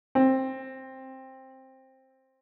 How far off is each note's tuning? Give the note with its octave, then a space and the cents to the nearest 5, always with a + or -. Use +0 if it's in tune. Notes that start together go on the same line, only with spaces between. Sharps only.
C4 +10